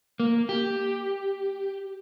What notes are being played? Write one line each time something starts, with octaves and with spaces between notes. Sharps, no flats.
A#3
G4